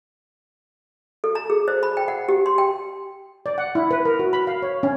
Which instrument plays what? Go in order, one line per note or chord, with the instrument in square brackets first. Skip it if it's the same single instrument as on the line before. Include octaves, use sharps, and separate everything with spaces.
[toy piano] A4
A#5
G#4
C5
B5
G5
F#5
G4
C6
G5
[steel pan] D5
F#5
E4
B4
A#4
F#4
B5
F5
C#5
C#4